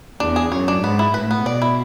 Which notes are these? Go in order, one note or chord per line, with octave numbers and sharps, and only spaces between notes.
E2 D4
G#4
F#2 C#5
D4
G#2 B3
E4
A2 B4
B3
B2 D5
E4